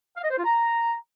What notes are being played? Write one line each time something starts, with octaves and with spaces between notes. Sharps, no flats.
F5
D#5
C5
F4
A#5